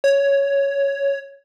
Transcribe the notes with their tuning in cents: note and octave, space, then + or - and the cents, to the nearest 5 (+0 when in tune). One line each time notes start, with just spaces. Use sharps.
C#5 +5